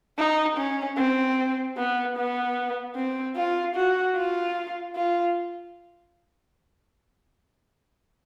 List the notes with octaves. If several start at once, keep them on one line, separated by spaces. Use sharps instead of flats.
D#4
C#4
C4
B3
B3
C4
F4
F#4
F4
F4